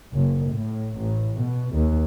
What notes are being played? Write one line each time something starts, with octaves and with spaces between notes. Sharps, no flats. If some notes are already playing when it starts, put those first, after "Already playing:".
F#1
A2
A1
B2
D#2